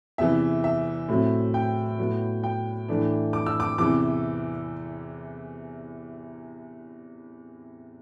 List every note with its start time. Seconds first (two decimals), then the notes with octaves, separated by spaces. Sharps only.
0.18 E2 C3 E3 E5
0.64 E5
1.09 A2 F#3 C4
1.54 G5
1.99 A2 F#3 B3
2.43 G5
2.89 A2 E3 A3 D4
3.33 D6
3.46 E6
3.60 D6
3.78 E2 C3 E3 D6